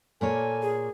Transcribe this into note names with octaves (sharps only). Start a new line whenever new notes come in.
A#2 A#3 A4 C#5 G#5
G#4